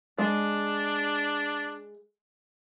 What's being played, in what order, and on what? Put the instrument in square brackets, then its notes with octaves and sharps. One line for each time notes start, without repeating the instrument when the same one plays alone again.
[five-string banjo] G#3 [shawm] D4